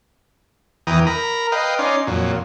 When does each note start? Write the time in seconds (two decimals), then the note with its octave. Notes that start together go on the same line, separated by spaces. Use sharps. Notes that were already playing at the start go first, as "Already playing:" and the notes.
0.87 E2 E3 G5 A#5 D#6
1.07 A#4 A#5 B5
1.52 B4 D#5 F5 G5
1.79 C#4 D#4 D5 C6
2.07 F2 A#2 F#3